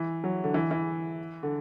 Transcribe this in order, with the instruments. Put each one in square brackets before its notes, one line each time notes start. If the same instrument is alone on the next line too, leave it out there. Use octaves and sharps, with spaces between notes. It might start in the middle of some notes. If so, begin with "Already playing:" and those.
Already playing: [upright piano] E3
F#3
D3
E3
E3
D3